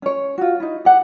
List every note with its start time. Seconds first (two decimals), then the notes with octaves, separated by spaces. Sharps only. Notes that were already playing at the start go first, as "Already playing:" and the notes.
0.02 C#4 C#5
0.38 F4 F#4
0.60 D#4 E4
0.85 G4 F#5